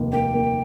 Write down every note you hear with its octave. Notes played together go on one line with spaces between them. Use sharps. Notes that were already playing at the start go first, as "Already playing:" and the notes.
Already playing: F1 D#2 A#3
A#3 G5
A#3